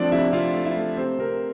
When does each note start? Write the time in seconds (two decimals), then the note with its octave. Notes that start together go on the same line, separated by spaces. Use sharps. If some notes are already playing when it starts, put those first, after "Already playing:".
Already playing: F3 A3 C4 D4 D5
0.12 C3 E4 E5
0.33 C3 F4 F5
0.55 A3
0.65 E4 E5
0.77 A3
0.97 C3 C4 C5
1.19 C3 A#4